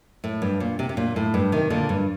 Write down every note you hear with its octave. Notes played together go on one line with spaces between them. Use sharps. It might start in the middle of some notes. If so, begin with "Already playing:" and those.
A2
G2
A#2
C3
C3
A#2
A2
G2
C3 D#3
A#2 D3
G2